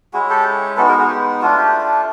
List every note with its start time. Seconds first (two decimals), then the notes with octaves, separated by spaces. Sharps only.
0.13 G#3 C#4 E4 F#4 G#4
0.30 G4 A4
0.77 G#3 B3 D#4 F#4 A4 B4
0.88 G#4 A#4
0.99 F#4 G#4
1.09 G4
1.41 A3 D4 F4 F#4
1.57 G4